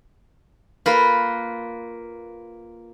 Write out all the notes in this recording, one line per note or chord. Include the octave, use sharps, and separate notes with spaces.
A#3 F4 B4